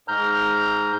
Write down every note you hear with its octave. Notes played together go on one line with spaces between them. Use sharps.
G#2 A#5 F6 G6